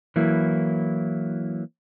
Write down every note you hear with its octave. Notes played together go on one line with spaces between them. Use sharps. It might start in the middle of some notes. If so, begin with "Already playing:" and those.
E3 F#3 A#3 E4